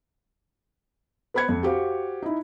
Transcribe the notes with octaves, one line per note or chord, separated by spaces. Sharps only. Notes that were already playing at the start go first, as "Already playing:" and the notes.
B3 C5 B5 F#6 G#6 C#7
F2
F#4 G4 C5 F5
D#4 E4